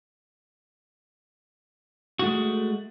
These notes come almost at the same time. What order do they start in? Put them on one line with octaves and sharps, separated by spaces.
F#4 A3 G#3